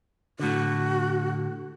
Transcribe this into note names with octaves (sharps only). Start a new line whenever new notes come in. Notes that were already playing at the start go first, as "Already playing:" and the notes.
A2 D3 F#4